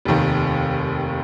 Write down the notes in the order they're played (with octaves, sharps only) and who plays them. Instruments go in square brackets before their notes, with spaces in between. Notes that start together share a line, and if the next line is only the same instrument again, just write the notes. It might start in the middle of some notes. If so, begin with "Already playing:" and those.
[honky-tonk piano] F1 D#2 D#3